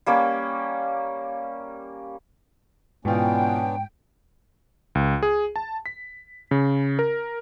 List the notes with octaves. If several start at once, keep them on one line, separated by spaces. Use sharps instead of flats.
G3 A#3 C#4
G#2 B2 E3 B3 C#4 D4 F4 G5
C#2
G#4
A5
B6
C#3
A#4